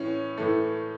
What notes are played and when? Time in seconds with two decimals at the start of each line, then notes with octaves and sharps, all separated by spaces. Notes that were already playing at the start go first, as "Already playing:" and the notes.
Already playing: A2 E3 C#4
0.38 A2 E3 A3